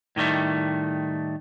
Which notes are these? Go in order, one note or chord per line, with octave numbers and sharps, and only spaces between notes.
A2 D#3 G3 A3